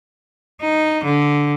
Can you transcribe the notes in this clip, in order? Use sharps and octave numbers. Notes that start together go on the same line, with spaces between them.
D#4
D3